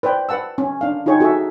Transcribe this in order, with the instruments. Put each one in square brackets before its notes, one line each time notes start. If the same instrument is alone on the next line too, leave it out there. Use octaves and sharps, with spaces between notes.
[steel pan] B4 C5 D5 G5
B4 F#5 A5 E6
C#4
D4 F5
D#4 F4 G#4 C#5 G5 C#6
F#4 G#4 A4 E5